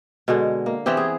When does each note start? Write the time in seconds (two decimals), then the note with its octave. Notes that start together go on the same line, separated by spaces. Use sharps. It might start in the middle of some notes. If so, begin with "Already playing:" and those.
0.28 B2 D3 G#3
0.66 A#3
0.86 E3 B3 C4 G4
0.97 G#4